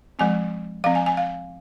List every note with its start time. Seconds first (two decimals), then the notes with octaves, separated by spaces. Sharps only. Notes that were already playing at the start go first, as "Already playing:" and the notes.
0.19 F3 G#3 C4 G#5
0.84 F3 C4 F5
0.95 G#5
1.06 G#5
1.17 F5